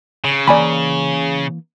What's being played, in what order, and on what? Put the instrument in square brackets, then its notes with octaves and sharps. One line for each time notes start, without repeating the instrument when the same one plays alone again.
[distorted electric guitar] C#3
[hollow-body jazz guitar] E3 A#3 A#5 [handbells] D5 G#5 B5